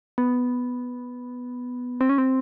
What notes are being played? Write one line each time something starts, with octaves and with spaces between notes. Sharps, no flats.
B3
C4
C#4
C4